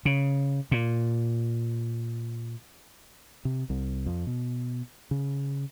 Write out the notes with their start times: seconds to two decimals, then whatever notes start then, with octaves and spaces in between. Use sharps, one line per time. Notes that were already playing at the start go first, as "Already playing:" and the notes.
0.05 C#3
0.71 A#2
3.45 C3
3.70 C2
4.06 F2
4.27 B2
5.11 C#3